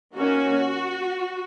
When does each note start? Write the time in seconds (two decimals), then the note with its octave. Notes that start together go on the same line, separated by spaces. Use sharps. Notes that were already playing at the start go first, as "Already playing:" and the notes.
0.16 D#3 A#3 C#4 F#4